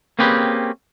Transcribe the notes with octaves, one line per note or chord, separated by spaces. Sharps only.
A#3 C4 C#4 G4 G#4 B4